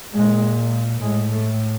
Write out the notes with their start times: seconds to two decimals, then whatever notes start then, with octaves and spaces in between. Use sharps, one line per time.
0.13 A#2 G#3
1.01 A2 G#3
1.31 A3